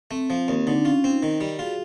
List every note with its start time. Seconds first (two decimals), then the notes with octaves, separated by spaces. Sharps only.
0.11 A3 C4
0.30 F3
0.48 D#2
0.67 D3 D#4
0.76 D4
0.85 C#4 F4
1.04 C4
1.09 D#4
1.23 D#3
1.41 G3
1.59 F4 F#4 G#4